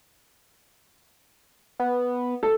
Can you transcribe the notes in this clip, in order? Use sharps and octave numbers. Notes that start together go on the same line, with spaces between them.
B3
A4